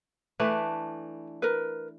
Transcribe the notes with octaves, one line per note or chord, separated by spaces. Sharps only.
E3 A3 D4 B4
A#4 B4